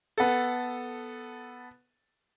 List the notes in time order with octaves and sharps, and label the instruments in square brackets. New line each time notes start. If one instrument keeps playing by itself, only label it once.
[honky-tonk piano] B3 A4